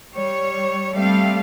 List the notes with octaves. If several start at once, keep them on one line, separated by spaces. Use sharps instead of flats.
G3 C#5
G3 A3 C4 F5